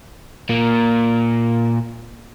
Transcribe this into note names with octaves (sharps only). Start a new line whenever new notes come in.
A#2 A#3